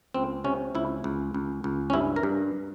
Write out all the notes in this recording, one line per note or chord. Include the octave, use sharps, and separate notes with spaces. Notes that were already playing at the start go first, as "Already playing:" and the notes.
C#2 C4
C3 C#4
C#2 E4
C#2
C#2
C#2
C#4
G2 E4
A#4
G2